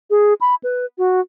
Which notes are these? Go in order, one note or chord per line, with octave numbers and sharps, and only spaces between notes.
G#4
B5
B4
F#4